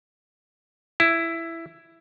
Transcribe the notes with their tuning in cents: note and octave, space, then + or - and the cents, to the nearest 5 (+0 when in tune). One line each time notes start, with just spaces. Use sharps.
E4 +10